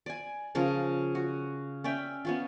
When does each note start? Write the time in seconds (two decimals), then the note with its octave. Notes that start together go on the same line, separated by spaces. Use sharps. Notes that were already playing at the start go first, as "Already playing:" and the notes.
0.06 D5 G#5
0.55 C#3 F3 C#4 A#4
1.15 F#4
1.84 C#4 D5 E5 G5
2.25 B3 C#4 F4